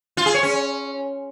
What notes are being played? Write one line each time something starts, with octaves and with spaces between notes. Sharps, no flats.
F4
G#4
C#5
C#4